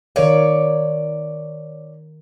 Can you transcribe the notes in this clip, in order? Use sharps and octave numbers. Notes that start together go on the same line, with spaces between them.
D#3 A#4 C#5 D5 F5